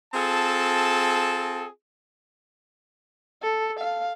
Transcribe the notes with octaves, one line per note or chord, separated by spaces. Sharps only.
C4 F4 G#4 A4 A5
A4
F5